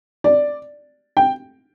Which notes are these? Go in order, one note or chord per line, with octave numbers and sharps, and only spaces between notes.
D5
G5